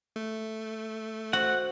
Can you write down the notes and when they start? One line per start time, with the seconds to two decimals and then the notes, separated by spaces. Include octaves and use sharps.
0.16 A3
1.33 F#4 C5 F#5